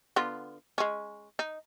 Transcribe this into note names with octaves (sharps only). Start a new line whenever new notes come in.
D3 B3 F4
G#3 C#4
D#4